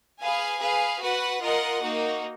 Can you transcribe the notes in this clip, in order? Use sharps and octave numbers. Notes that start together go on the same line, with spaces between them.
G#4 B4 F5 G#5
G#4 B4 F5
F#4 B4 F#5
F4 A#4 D#5 F#5
A#3 D#4 F#4